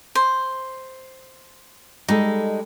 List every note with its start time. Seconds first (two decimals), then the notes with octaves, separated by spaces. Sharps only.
0.15 C5
2.08 G3 G#3 D#4 A4